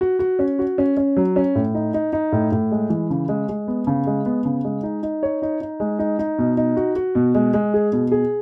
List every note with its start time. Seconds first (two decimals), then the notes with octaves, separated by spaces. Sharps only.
0.01 F#4
0.19 F#4
0.39 C#4
0.59 F#4
0.78 C#4
0.97 C#4
1.16 F#3
1.36 C#4
1.55 A2
1.74 D#4
1.94 D#4
2.13 D#4
2.32 A2
2.52 A2
2.72 G#3
2.90 E3
3.10 C#3
3.29 G#3
3.49 G#3
3.68 B3
3.87 C#3
4.07 G#3
4.26 B3
4.45 C#3
4.64 G#3
4.83 D#4
5.03 D#4
5.23 C#5
5.42 D#4
5.61 D#4
5.80 G#3
5.99 D#4
6.19 D#4
6.38 B2
6.57 D#4
6.77 F#4
6.96 F#4
7.15 B2
7.35 G#3
7.54 G#3
7.74 G#4
7.93 B2
8.12 G#4